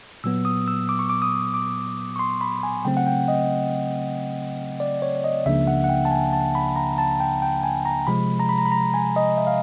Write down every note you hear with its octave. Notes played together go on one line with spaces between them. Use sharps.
A#2 F#3 B3 E6
D#6
E6
D6
C#6
D6
D#6
D6
C#6
C6
B5
G#5
C#3 F#3 A3 C4 G5
F#5
G5
D#5
D5
C#5
D#5
C#2 C#3 F3 A#3 D4 E5
F#5
F#5
G5
A5
G#5
A5
B5
A#5
A5
G5
G5
G#5
A#5
C3 F3 G#3 B5
A#5
B5
A#5
B5
A#5
G#5
D#5
E5
F5